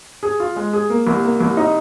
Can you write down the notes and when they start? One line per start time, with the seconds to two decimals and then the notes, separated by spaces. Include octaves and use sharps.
0.23 G#4
0.40 F4
0.56 G#3
0.73 G#4
0.90 A#3
1.07 C2
1.23 A#3
1.41 C2
1.57 D#4